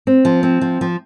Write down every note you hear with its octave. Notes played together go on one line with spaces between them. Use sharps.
C4
F3
C4
F3
F3